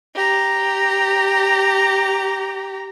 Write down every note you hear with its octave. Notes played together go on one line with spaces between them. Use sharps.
G4 A#5